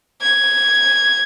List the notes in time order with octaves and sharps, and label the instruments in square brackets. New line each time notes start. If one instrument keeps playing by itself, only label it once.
[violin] G#6